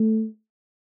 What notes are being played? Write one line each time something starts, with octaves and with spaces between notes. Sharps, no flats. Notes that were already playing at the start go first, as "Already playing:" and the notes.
Already playing: A3